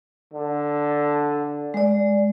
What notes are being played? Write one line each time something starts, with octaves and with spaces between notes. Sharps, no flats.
D3
G#3 D5